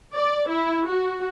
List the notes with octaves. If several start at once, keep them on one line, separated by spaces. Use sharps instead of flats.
D5
E4
F#4